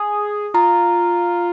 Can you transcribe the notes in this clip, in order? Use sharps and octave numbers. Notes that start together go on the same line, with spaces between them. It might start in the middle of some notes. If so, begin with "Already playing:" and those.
Already playing: G#4 D#6
F4 A#5